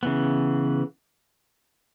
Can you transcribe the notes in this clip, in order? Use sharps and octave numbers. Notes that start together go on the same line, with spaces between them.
C#3 E3 B3